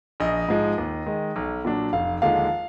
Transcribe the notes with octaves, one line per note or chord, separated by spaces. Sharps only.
A#1 D#5
G#2 F3 G#3
D#2
D#3 G#3
B1
A#2 F#3 D4
F1 F5
D#2 D3 F3 G#3 F5